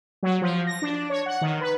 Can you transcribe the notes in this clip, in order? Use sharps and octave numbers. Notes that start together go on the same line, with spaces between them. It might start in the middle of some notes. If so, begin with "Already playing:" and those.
F#3
F3
A#6
D4
C#5
F#5
D#3
B4